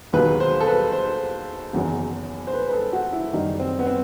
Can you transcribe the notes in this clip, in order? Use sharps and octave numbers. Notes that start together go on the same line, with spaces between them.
E1 D#2 D#3 F#3 B4
C5
A4
B4
C5
F#1 E2 D#3 F#3
C5
B4
B4
A4
F#4
E4
F#1 F#2 D#3 G3 D#4
C4
B3
C4